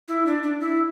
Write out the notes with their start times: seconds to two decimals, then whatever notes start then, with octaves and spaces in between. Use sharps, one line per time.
0.08 E4
0.26 D4
0.43 D4
0.60 E4